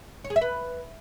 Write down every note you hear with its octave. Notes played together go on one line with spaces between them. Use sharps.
C#5
G#4
E5
B4